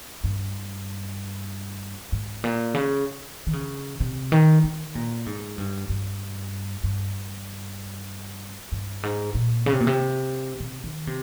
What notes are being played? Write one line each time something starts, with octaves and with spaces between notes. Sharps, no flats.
G2
G#2
A#2
C#3
D#3
C#3
C3
D#3
D#3
A#2
G#2
G2
G2
G2
G2
G#2
A#2
C#3
C3
A#2
C3
C3
D#3
C3